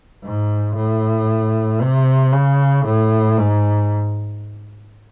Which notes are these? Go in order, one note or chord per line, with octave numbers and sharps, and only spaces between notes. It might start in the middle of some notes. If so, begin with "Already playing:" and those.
G#2
A2
C3
C#3
A2
G#2